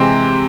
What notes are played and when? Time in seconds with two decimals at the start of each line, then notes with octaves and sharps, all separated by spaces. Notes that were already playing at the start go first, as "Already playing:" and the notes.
Already playing: C3 E3 G#3 C4 C5